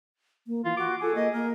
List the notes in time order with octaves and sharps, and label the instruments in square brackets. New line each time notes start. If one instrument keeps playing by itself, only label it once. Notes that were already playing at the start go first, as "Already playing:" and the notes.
[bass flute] A#3
[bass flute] E3 [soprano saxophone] F4
[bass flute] F4 [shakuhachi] F#4 [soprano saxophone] D6
[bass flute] F4 [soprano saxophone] G#4 [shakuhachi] A4
[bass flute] A#3 [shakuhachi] D#5
[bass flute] A#3 [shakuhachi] A#4